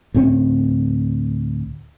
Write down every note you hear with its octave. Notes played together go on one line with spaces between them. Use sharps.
D2 A2 C4 C#4